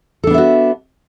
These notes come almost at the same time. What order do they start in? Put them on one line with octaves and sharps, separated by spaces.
A4 D4 B3 E5 F#4